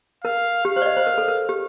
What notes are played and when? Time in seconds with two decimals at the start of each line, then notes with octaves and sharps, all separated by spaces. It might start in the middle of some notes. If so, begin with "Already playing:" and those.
0.24 A#4 F5
0.65 G4 F5
0.76 C5
0.82 D5
0.86 D#5
0.97 C5
1.07 A#4
1.18 A4
1.28 A#4
1.49 G4